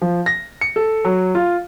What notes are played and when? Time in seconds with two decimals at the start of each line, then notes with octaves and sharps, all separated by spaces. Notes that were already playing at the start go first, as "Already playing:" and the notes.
0.02 F3
0.26 A#6
0.61 C#7
0.76 A4
1.05 F#3
1.35 F4